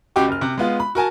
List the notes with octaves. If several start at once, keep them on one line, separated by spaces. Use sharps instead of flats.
C#2 F#4 G4 G5 D6
F#1 F6
C3 F#6
G#3 B3 F4
B5
F#4 A#4 G#5 A5